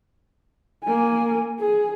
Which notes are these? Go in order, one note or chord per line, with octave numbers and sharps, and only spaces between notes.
A#3 G#5
G#4